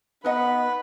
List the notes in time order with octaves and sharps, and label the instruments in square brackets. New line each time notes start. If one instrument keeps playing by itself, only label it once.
[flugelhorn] B3 [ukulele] D#4 D#5 F#5 [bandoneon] B4 [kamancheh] B5